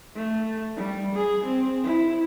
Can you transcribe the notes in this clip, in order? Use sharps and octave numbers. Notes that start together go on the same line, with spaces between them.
A3
G3
G#4
C4
E4